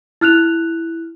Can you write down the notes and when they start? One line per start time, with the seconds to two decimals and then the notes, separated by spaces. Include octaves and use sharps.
0.21 E4 F6 F#6 F7